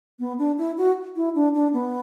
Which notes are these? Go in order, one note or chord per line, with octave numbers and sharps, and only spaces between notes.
B3
D4
E4
F#4
E4
D4
D4
B3